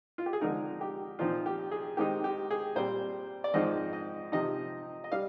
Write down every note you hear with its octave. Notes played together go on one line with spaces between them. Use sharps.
F4
G4
G#4
D3 F3 G#3 C4 D#4 A#4
G4
A#2 F3 C4 D#4 F4
G4
G#4
D#3 G#3 C4 D#4 G4
G4
G#4
A#2 G3 C4 C5
D5
G#2 F3 G#3 C4 D#4 D#5
D#5
C3 F3 C4 D#4 D#5
D#5
G3 D4 F5